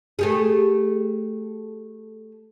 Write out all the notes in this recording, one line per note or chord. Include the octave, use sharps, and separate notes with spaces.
A3 G4 G#4